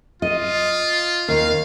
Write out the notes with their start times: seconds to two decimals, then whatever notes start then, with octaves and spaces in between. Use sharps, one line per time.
0.22 F4 D#5
1.29 D#2 F5